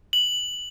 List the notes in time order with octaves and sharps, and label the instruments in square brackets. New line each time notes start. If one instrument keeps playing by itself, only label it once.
[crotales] F#7